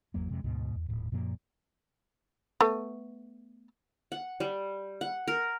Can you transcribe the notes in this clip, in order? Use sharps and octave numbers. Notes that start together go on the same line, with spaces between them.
G#1 E2 F#3 A#3
F2 C3 G#3
D2 G#2 B2
E2
D#1 A2
F#2 A#2 F3 A#3
A3 B3
F#5
G3
F#5
A#4